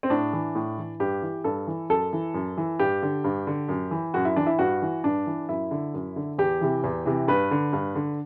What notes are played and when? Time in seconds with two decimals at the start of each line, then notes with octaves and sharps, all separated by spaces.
0.03 C4
0.10 A2 D4
0.33 E3
0.55 A2
0.78 E3
1.00 G2 G4
1.22 E3
1.44 G2 A4
1.67 E3
1.90 F#2 A4
2.13 E3
2.34 F#2
2.57 E3
2.79 G2 G4
3.03 D3
3.24 G2
3.47 D3
3.69 F#2
3.91 E3
4.14 F#2 F#4
4.25 E4
4.36 E3 D4
4.46 E4
4.59 G2 F#4
4.82 E3
5.04 G2 D4
5.27 E3
5.49 F#2 E4
5.71 D3
5.94 F#2
6.16 D3
6.38 E2 G4
6.61 C3 E3
6.84 E2
7.06 C3 E3
7.28 G2 B4
7.51 D3
7.73 G2
7.95 D3